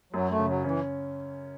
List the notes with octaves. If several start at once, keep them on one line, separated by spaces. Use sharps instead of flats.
F#2 F#3
A3
C#3
F#3
E3 C#4